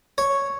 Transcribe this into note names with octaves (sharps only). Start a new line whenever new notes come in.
C#5